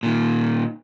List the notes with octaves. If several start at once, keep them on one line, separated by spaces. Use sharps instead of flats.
A#2 D#3